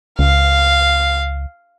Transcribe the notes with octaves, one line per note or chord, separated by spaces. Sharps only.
C#2 F5